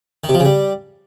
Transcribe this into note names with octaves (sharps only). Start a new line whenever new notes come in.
D#3
C3
F3
C#3
G3